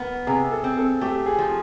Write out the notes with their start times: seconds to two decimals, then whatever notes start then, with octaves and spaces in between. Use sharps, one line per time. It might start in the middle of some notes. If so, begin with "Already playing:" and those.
Already playing: B3 A#4
0.27 C3 G#4
0.52 A4
0.64 C4
0.77 A4
1.01 A3 G4
1.26 G#4
1.39 F3